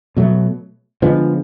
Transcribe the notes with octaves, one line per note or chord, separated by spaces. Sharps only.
B2 F#3 A3
D3 F3 G#3 B3